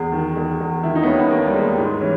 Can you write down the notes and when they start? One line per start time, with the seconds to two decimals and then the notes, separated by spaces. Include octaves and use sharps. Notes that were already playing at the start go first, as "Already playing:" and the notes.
Already playing: E2 G#4
0.12 D#3
0.37 E2
0.60 E2
0.83 D#3 E4
0.95 D#4
1.03 B3
1.06 D#2 C#4
1.19 B3
1.30 D#2 A#3
1.46 G3
1.54 D#2 G#3
1.78 G#2
2.01 E3 C#4